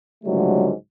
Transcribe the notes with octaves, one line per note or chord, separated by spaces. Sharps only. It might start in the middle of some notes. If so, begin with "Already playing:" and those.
C#2 G#2 D3 F#3 G3 A3